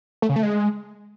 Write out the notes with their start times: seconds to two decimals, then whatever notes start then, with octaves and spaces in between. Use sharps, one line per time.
0.22 A3
0.29 C#3
0.36 A3
0.43 G#3